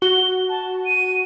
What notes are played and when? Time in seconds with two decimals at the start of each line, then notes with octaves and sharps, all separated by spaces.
0.02 F#4 G7
0.49 A5
0.85 D#7